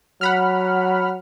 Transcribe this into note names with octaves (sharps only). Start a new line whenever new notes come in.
F#3 F#5 B5 F6